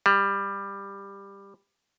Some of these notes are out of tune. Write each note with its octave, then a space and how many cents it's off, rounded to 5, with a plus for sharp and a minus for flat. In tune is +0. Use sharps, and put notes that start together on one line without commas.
G3 +15